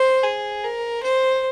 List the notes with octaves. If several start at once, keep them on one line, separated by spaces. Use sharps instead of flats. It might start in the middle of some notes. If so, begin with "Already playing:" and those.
Already playing: C5
G#4
A#4
C5